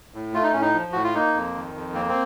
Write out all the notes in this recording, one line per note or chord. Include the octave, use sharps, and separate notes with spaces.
A2
A3 F4
D#4
A2 C#4
D#4
F3
A2 F#4
F4
A#3 D#4
F2
D#3
F2
A#3 C4
C4